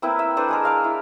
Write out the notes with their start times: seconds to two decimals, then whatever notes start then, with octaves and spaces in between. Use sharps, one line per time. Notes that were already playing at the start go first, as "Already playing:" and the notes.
0.02 A#3 C4 E4 B4
0.19 E5
0.37 D4 A4 B4 C5
0.49 G#3 G#4 A#4
0.63 D5 F5 A#5
0.84 E4